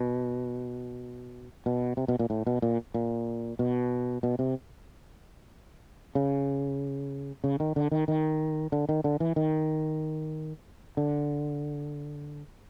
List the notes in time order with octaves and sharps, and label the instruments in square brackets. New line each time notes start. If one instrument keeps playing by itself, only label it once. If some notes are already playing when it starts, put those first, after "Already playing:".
Already playing: [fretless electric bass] B2
B2
C3
B2
A#2
A2
B2
A#2
A#2
B2
B2
C3
C#3
C#3
D#3
D3
D#3
D#3
D3
D#3
D3
E3
D#3
D3